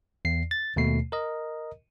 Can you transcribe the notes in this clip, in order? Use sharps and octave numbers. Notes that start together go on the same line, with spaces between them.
E2 C7
A6
D#2 B2 A3 C7
A#4 D#5